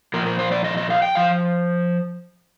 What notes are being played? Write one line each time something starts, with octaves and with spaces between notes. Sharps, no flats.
A#2 F3 A#4
A#4
C5
D5
D#5
D#5
F5
G5
F3 F5